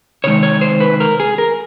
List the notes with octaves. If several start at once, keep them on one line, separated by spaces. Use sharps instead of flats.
C3 D#3 G#3 C#5
C#5
C5
B4
A#4
G#4
A#4